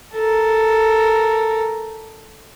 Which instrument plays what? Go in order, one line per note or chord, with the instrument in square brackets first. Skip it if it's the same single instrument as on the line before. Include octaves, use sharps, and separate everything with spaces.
[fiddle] A4 A#4